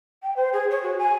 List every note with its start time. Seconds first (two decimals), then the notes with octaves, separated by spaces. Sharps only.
0.23 G5
0.36 C5
0.53 G#4
0.70 C#5
0.83 F#4
0.98 G#5